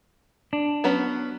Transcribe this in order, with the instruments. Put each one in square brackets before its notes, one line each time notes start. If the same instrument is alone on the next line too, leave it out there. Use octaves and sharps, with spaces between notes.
[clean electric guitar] D4
[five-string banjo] F#3 B3 C#4